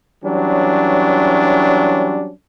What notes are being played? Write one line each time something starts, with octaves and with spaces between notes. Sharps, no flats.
E3 F#3 G3 C#4 D4